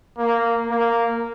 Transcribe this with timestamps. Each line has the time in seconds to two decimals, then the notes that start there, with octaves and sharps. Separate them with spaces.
0.18 A#3
0.70 A#3